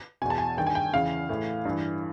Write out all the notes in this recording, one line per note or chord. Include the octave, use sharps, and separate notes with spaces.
E2 B2 G#5
A5
G#5
G2 D#3 G5
G#5
G5
E2 C#3 E3 F5
A2 E3
G2 E3